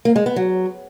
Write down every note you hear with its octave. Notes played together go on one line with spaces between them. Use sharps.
A#3
G#3
B3
F#3